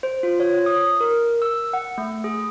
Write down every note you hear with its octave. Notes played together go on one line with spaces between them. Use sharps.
C5
F4
C#5
D#6
A#4
E6
F#5
A3
G#4